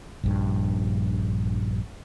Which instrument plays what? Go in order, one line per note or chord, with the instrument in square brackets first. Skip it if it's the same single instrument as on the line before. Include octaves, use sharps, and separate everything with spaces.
[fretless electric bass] A#1 G2